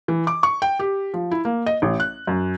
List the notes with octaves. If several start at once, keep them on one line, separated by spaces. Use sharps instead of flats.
E3
D6
C#6
G5
G4
F3
E4
A#3
D#5
A1
F#6
F#2